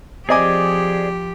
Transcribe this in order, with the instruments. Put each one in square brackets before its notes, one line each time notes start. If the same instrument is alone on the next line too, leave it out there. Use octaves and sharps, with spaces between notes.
[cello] F3 G4 [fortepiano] C4 D#5 G#5 [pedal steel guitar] G#4 D5 D6